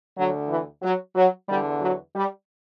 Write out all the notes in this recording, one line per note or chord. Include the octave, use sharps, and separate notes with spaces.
D2 D3 F#3
E3
F#3
F#3
E2 D3 G3
F#3
G3